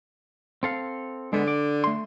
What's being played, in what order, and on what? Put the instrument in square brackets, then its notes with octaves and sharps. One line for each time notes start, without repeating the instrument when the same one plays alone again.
[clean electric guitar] C4 A4 F5
[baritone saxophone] D3 [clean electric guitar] G#3 B3
[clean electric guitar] D5
A3 C6